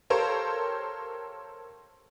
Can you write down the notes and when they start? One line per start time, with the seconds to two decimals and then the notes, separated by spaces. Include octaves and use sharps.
0.10 G4 A4 A#4 C5 C#5 F5